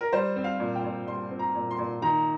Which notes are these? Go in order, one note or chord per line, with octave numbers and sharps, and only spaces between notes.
A#4
G3 C5
C4
F5
A#2
G5
A#2
G3 C6
C4
A#5
A#2
C6
A#2
D#3 A#5